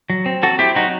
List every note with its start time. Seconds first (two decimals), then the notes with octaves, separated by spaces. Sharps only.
0.10 F#3
0.26 C4
0.43 F#3 F#4 A4
0.59 C4 E4 G4
0.75 F#3 D#4 F#4